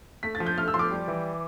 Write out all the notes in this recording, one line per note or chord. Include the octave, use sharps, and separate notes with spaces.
A3 B6
A6
F3
G6
A3 F6
E6
F3 C6
D6
G3
E3